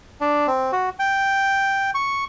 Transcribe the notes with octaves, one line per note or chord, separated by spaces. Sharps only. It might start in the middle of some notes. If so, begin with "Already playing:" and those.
D4
C4
F#4
G5
C#6